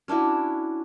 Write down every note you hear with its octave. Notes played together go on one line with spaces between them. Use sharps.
C#4 D4 E4 F#4